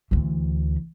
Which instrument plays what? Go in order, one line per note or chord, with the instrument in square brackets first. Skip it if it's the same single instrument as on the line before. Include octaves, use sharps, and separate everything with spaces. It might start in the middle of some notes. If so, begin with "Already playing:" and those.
[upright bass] D2 E3